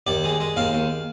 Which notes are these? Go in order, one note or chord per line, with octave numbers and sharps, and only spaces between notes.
D#2 D5
G#3
G#3
D#2 F5
D#2